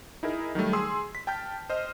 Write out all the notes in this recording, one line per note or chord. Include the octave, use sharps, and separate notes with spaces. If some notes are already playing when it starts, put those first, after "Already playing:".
D#4 E4 G#4 A#4
D#3 F#3 G3 A3
G#4 C6 D#6 E6
B6
G5 A5 F6 G6
C5 D#5 F6